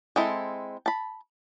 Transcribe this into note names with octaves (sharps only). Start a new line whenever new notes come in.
G#3 C4 E4 A4
A5 B5